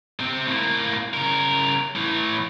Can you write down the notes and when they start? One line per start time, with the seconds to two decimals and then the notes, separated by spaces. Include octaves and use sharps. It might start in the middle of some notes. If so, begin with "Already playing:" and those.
0.20 C3 C4
0.47 A2 A#3
1.14 C#3 A#4
1.96 A2 E3